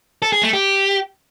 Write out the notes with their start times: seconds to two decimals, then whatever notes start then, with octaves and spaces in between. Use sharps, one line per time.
0.22 A4
0.33 G#4
0.43 A3
0.53 G4